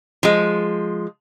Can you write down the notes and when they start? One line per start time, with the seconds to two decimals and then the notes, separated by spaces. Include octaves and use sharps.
0.23 F3 G#3